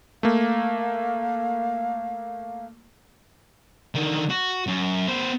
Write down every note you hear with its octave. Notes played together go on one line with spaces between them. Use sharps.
A3 A#3 F5
D3 D#3
F#4
F#2
B3 C5